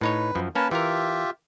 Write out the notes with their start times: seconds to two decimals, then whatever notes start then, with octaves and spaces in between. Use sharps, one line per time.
0.01 A2 D#4 B4 C#5
0.35 F#2 F3
0.55 A#3 C#4 A#4 B4 A5
0.71 E3 F4 G4 A#4 E5